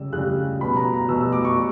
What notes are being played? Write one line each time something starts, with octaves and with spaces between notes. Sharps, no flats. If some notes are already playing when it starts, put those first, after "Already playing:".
Already playing: C#3 G3 E6
C#3 G3 F#6
B2 G3 B5
A#5
A#5
B2 G3 E6
E6
D6
C#6
G3